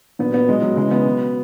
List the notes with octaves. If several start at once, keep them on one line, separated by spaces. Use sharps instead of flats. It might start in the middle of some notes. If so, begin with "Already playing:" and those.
A#2 F#3 B3
B3
B2 F#3 G#3
F#3
C#3 E3 G#3
B3
B2 F#3